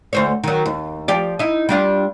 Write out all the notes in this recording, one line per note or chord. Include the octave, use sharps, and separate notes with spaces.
D2 C5 C#5
D#3 F#3
D#2
F3 G4 D5
D#4 E4
G3 D4 F4